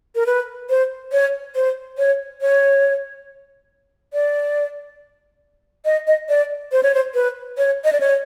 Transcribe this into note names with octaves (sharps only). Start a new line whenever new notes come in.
A#4
B4
C5
C#5
C5
C#5
C#5
D5
D#5
D#5
D5
C5
C#5
C5
B4
C#5
D#5
D5
C#5